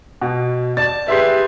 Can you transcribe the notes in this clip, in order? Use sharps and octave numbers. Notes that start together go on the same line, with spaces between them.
B2
D5 A5 A6
G4 G#4 B4 E5 C6 C7